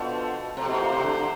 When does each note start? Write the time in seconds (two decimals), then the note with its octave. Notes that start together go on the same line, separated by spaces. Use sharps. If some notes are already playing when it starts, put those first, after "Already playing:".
Already playing: B2 B3 D4 F4 A4 C5
0.57 C3 A3 C4 E4 G4 C5
0.68 B2
0.80 A#2
0.92 C3
1.03 D3